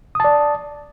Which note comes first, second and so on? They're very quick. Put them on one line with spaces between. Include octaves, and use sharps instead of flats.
D#6 A5 D5